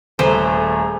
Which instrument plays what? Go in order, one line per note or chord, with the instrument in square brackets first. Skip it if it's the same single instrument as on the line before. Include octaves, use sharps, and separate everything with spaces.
[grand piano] D#1 A#5 [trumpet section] A3 G#4 [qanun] A4 B4 C5